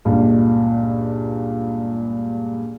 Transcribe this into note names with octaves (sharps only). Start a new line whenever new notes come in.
C#2 G2 A#2